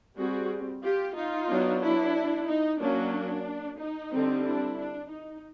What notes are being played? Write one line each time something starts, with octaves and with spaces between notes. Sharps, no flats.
G3 C4 F#4 G#4
F4 G4
D#4 F4
F#3 B3 D4
D4 E4
D#4
F#3 A#3 C#4 D4
D#4
D3 G3 C4
D4 E4
D4
D#4